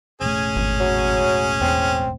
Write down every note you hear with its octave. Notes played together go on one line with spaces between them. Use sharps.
E1 A1 A3 C#4 G#4
G#1
F#3
E2 C4